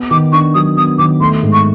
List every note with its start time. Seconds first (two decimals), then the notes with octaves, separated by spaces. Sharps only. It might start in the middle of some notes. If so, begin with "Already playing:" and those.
Already playing: B3
0.11 D#3 D6
0.32 D4 C#6
0.55 F#3 D#6
0.77 B3 D#6
0.98 D#3 D6
1.21 A3 C6
1.42 G#2
1.53 C#6